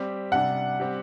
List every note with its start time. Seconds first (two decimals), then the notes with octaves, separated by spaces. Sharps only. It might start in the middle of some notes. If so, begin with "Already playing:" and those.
Already playing: G3 C4 G4
0.31 C3 G3 D4 F#5
0.79 G3 C4 G4